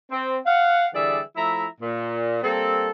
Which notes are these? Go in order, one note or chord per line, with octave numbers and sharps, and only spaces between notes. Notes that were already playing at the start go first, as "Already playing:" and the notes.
C4
F5 F#5
D3 E3 G3 G#4 D5 E5
F3 A3 E4 E5 A#5
A#2
G3 A#3 C4 A4